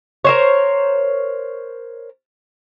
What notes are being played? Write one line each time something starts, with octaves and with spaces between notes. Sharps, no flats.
A#4 C5 C#5